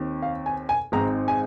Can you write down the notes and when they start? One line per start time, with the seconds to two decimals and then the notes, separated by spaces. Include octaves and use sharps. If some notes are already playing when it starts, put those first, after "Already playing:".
Already playing: D#2 D#3 C4
0.22 F5
0.46 G#5
0.69 G#5
0.92 G#1 G#2 G#3 C4 A#5
1.28 G#5